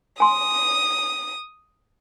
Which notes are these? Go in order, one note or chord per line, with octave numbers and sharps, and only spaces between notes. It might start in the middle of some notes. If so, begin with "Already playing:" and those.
G#5 C6 D#6